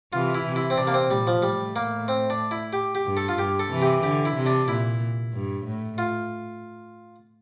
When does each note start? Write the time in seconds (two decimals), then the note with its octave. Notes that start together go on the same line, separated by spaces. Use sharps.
0.13 C3 E3 F4
0.35 E4
0.45 C3
0.56 E4
0.70 C4
0.78 C3 D4
0.87 A#3
0.94 C4
1.10 A#2 G3
1.27 F3
1.42 A2 G3
1.76 A#3
2.08 C4
2.30 D4
2.51 E4
2.73 G4
2.95 G4
3.06 G2
3.17 A4
3.29 F4
3.38 G2 G4
3.60 A4
3.70 C3 E3
3.82 G4
4.03 D3 G4
4.25 E4
4.35 C3
4.46 D4
4.68 A#2 E4
5.33 G2
5.66 A2
5.98 F4